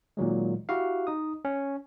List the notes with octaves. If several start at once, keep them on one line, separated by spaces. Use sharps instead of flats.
A#2 D#3 F#3 G#3
E4 F#4 G4 F5
D#4 D#6
C#4